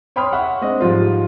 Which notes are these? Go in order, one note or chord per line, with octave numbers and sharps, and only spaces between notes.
C#5 G5 B5 C6 D#6 F6
E5 F#5 C#6
G#3 C4 D4 D#5
G#2 F3 G3 F4 C5